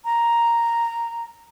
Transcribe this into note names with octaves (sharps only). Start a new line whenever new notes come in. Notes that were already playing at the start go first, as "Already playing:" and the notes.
A#5